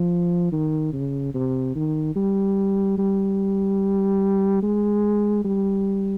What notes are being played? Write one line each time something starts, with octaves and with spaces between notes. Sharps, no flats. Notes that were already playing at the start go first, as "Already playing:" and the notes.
Already playing: F3
D#3
C#3
C3
D#3
G3
G3
G#3
G3